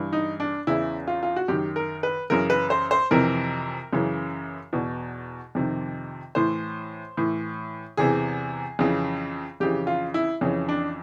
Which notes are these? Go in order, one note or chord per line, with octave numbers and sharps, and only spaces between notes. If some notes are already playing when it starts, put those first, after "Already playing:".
Already playing: G2 E3
D#4
D4
E2 C#3 E3 E4
F4
F4
F#4
F#2 D#3 G4
A#4
B4
F#2 C#3 E3 A#4
B4
C5
C5
F2 C3 E3 A#4
F#2 C#3 E3
E2 B2
F2 C3 D#3
A2 E3 C5
A2 E3
E2 C3 E3 G#4
F2 C#3 E3
F2 C#3 E3 G4
F4
E4
F2 C#3 E3 C#4
D4